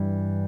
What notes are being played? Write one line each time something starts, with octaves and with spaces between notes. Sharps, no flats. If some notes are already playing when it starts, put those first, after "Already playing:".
Already playing: G2 E3 G3